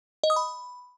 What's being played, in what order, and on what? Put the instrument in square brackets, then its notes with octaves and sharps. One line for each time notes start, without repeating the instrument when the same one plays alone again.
[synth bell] D#5
D#6
B5